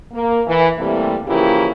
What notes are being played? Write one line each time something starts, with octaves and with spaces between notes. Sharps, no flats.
A#3
E3
C3 E3 G3 A3 A#3
C#3 E3 F3 A#3 E4 G4